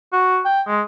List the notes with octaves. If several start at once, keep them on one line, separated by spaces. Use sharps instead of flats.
F#4
G5
G#3